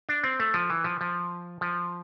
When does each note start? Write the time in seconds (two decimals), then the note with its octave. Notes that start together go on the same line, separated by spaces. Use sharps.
0.09 D4
0.24 C4
0.40 A3
0.54 F3
0.70 E3
0.84 F3
1.01 F3
1.61 F3